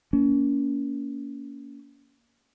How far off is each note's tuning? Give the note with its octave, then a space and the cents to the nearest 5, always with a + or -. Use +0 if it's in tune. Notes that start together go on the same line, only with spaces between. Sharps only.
A#3 +0 C#4 +25